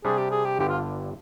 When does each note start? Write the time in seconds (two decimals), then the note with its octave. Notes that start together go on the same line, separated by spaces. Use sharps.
0.05 C3 G3 D4 G#4
0.18 G4
0.31 G#4
0.45 G4
0.59 G1 G2 D3 G4
0.69 F4